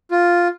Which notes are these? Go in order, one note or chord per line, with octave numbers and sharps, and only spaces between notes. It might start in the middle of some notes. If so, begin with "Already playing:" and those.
F4